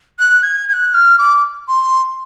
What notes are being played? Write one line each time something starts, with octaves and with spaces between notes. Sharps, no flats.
F#6
G#6
G#6
F#6
F6
D6
C6